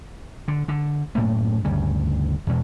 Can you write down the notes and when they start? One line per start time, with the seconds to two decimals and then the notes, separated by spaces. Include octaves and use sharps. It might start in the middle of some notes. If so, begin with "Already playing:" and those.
0.48 D3
0.68 D3
1.15 F#2 A2 A3 A#3
1.65 D2 G2 C#3 G3
2.47 E2 B2 G#3